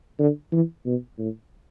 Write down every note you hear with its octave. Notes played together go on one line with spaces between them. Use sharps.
D3
E3
B2
A2